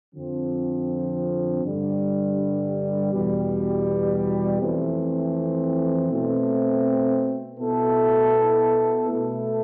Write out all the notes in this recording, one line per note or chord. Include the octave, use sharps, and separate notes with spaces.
F2 D3 F3 C4
G2 D3 G3
E2 B2 G3
F2 E3 A3 C4
B2 A3 C4
B2 B3 E4 A4
B2 A3 E4 A4